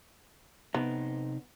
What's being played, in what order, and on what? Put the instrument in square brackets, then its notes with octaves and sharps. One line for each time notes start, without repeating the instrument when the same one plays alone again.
[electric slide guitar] C3 D#4 [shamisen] B3